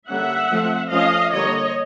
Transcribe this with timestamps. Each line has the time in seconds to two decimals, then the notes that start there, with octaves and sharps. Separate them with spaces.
0.09 D3 G3 A#3 C#4 E5 F#5
0.50 F3 A3 C4
0.91 F3 A3 C#4 D#5 F5
1.32 D3 G3 A#3 C#5 D#5